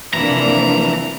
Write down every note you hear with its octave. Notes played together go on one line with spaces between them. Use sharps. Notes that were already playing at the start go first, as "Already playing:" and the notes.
C3 E3 F3 A#3 D4 E4 A#5